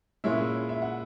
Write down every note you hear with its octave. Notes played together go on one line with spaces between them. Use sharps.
A#2 G#3 C#4 E4 E5
E5
F#5